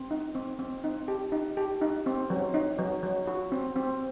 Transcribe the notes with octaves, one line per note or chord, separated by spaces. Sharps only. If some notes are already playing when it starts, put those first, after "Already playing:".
Already playing: C4
D#4
C4
C4
D#4
G4
D#4
G4
D#4
C4
F#3
D#4
F#3
F#3
F#4
C4
C4